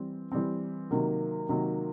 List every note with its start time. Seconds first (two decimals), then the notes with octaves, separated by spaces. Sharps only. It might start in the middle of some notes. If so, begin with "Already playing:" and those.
Already playing: E3 G3 C4
0.32 E3 G3 C4
0.91 C3 D#3 F#3 A#3
1.49 C3 D#3 F#3 A#3